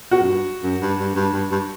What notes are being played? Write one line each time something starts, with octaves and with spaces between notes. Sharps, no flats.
B2 F#4
F#2
G2
F#2
G2
G2
G2
G2
G2